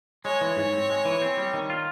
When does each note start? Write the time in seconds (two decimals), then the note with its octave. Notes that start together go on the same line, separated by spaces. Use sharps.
0.25 G#3 C#5
0.41 E3
0.57 G#2
0.74 C4
0.90 G#3
1.05 E3
1.22 C4
1.38 G3
1.54 D#3
1.70 F4